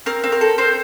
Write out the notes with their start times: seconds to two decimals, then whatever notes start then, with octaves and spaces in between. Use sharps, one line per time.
0.06 C4 A#4
0.24 C4
0.32 A#4
0.41 A4
0.58 C4 C5